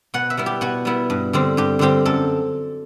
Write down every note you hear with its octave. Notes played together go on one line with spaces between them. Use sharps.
B2 F#5
E5
G3 B3 E4
G4
B2 F#4
G3 B3 E4
G2
D3 G3 C4
G2 G4
D3 G3 C4 G4
F#2 A4